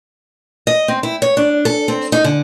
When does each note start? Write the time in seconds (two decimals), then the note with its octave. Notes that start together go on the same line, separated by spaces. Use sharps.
0.67 D#5
0.88 C4
1.03 E4
1.22 C#5
1.37 D4
1.65 A4
1.88 C4
2.12 D#4
2.24 D3